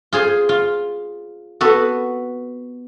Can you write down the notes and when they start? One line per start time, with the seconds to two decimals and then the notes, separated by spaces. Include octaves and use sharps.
0.13 F4 G#4 C5
0.49 F4
1.61 B3 F#4 A4